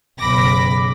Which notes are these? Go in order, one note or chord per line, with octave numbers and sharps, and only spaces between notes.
F#1 B1 B5 D6 A#6